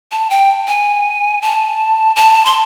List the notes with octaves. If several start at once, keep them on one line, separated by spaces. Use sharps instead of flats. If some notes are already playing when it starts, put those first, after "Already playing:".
A5
G5
G#5
A5
A5
C6